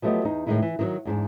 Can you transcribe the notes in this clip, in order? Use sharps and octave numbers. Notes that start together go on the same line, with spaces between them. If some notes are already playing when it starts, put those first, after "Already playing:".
F3 F#3 A3 B3 G4 D#5
E2 D#4
A2 D#3 E3 G#3 D#4 E4
E3
D#3 F3 F#3
E2 G#2 D4